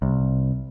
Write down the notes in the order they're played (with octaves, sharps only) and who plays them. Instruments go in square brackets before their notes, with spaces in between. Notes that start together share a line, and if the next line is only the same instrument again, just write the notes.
[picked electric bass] C2